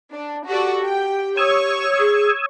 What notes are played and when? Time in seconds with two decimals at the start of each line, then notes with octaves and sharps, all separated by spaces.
0.12 D4
0.48 F#4 G4 A4 D5
0.84 G5
1.37 C#5 C#6 D#6 E6 G#6
1.99 G#4